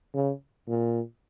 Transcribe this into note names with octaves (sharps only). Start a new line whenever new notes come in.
C#3
A#2